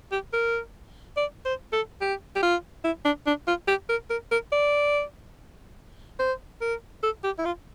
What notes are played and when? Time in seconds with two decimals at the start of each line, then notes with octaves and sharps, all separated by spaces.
0.12 G4
0.33 A#4
1.17 D5
1.45 C5
1.73 A4
2.01 G4
2.36 G4
2.43 F4
2.84 E4
3.05 D4
3.27 D4
3.47 F4
3.68 G4
3.89 A#4
4.10 A#4
4.31 A#4
4.52 D5
6.19 C5
6.61 A#4
7.03 A4
7.24 G4
7.39 E4
7.45 F4